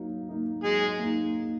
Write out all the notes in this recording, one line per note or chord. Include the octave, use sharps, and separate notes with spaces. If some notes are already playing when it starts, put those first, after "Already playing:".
Already playing: F#3 A#3 D#4
A#3 D#4
F#3 G#3 G#4
A#3 D#4